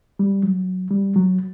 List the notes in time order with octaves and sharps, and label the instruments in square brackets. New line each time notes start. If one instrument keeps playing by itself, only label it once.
[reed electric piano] G3
F#3
G3
F#3